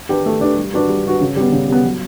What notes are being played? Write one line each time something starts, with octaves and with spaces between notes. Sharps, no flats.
D4 G4 B4
A3
D4 G4 B4
G3
D4 F#4 B4
G3
D4 F#4 B4
C#3
G3 B3
C#3
G3 B3
F#3